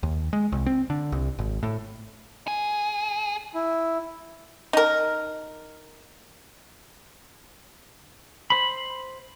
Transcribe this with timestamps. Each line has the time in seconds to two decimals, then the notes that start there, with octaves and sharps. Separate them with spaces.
0.03 D#2
0.33 G#3
0.52 C2
0.66 C4
0.90 D3
1.12 C2
1.39 G#1
1.63 A2
2.48 G#4
3.55 E4
4.73 D#4 A#4
8.50 C5 B5